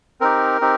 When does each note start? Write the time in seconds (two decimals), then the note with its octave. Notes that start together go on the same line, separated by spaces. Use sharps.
0.21 C4 D#4 G4 A#4
0.61 C4 D#4 G4